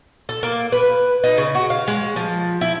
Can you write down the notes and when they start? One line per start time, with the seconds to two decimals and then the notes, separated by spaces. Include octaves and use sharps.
0.29 A4
0.43 A#3
0.72 B4
1.24 D#4
1.38 C#3
1.55 F#4
1.70 F5
1.88 G#3
2.16 F3
2.61 E4